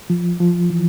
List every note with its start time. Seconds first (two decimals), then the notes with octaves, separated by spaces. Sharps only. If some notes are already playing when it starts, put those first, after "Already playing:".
0.10 F3
0.40 F3
0.70 E3